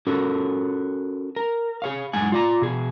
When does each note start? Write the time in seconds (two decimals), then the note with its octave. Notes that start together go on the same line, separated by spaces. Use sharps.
0.07 C#4 F#4 A4 A#4
1.36 A#4
1.82 G#4 C#5 F5
2.13 F#2 G#3 F#5 G#5
2.32 F4 D5 A#5
2.62 B2 G#4